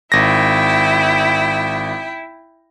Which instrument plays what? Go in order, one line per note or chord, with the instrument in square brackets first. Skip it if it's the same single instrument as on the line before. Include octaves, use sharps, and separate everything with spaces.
[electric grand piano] G#1 A#6 [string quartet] E4 G5